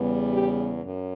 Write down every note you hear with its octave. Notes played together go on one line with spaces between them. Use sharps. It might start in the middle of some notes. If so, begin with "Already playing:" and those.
Already playing: E2 C#3 G3 B3
G4
F#2